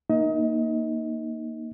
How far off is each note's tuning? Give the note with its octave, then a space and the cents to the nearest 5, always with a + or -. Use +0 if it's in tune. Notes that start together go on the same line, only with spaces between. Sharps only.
A#3 +0 D#4 -5 D#5 +30